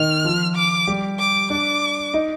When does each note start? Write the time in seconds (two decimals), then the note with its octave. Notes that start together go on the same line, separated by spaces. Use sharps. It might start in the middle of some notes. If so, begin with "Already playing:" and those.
Already playing: D#3 D#4 F6
0.24 F3 F4
0.55 D6
0.87 G3 G4
1.19 D6
1.50 D4 D5 D6
2.14 D#4 D#5